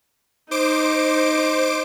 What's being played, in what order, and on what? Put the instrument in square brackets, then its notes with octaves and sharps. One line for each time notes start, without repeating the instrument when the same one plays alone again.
[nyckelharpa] D#4 [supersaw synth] C5 D6 D7